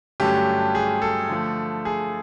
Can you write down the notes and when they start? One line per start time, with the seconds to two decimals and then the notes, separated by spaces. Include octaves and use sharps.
0.20 G2 D3 F#3 A3 C#4 G4
0.75 G#4
1.02 A4
1.29 D3 F3 A3
1.85 G#4